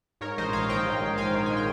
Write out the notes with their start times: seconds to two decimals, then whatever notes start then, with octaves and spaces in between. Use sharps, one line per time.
0.21 G#2 A#4 C#5
0.38 A#1 C5 D#5
0.53 A#1 C#5 F5
0.69 D#3 D#5 G5
0.85 G#2
1.02 A#1
1.17 D#3 F5 G#5
1.34 D#3
1.46 G#3 G#5
1.57 G5